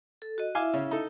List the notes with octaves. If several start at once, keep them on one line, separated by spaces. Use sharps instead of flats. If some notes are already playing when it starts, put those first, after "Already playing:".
A4
F#4 D#5
E4 E5 F5 G#5 D6
C#3 C#4
D#4 A4